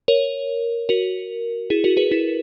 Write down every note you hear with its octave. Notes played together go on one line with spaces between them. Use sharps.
A#4 C#5
F#4 A#4
E4 G#4
F#4 A#4
G#4 B4
E4